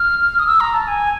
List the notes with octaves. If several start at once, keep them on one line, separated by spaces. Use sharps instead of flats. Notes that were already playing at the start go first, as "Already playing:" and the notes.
Already playing: F6
D#6
E6
A#5
A5
G#5